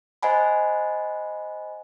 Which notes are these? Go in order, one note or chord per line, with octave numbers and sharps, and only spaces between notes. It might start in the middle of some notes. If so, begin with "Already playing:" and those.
C5 D#5 F#5 G#5 B5